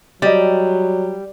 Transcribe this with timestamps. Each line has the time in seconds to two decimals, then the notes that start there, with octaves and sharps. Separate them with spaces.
0.22 F#3 G3 D5 D#5